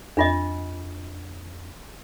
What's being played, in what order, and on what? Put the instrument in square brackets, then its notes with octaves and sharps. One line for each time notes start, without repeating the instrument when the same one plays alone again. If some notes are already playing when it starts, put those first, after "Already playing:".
[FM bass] F2 [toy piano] D4 F4 D#5